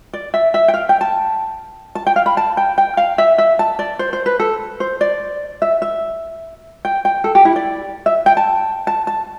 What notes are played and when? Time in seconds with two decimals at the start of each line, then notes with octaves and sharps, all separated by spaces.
0.13 D5
0.34 E5
0.54 E5
0.68 G5
0.74 F5
0.89 G5
1.01 A5
1.95 A5
2.07 G5
2.16 F5
2.26 B5
2.37 A5
2.57 G5
2.78 G5
2.97 F5
3.18 E5
3.38 E5
3.59 A5
3.79 D5
3.99 C5
4.13 C5
4.26 B4
4.40 A4
4.80 C5
5.01 D5
5.62 E5
5.82 E5
6.85 G5
7.05 G5
7.24 A4
7.35 G4
7.45 E4
7.56 D5
8.06 E5
8.26 G5
8.37 A5
8.87 A5
9.07 A5